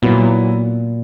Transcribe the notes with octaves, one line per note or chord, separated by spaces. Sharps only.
A#2 F#3 B3 E4